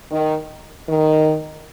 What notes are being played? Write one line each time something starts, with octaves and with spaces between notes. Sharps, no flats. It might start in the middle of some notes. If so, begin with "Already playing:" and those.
D#3
D#3